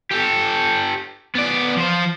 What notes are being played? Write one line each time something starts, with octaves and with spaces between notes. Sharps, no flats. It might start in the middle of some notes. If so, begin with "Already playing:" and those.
G4 A4
B3 D5
F3 C5